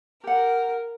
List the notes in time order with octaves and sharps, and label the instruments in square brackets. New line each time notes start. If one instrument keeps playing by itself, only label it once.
[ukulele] G4 F#5 [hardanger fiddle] A#4